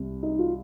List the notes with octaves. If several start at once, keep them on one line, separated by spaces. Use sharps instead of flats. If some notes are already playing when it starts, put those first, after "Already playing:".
Already playing: C2 C3
D#4
F4